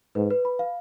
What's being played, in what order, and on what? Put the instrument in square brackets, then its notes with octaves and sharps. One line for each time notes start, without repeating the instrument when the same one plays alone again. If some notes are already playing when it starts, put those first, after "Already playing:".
[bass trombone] G#2 [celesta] B4
[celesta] B4
B5
F5